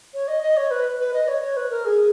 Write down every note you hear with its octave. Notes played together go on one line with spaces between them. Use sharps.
C#5
D#5
D#5
C#5
B4
B4
D#5
C#5
C#5
B4
A#4
G#4